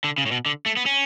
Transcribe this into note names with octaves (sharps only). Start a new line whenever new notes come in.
D3
C#3
A2
B2
D3
A3
B3
C#4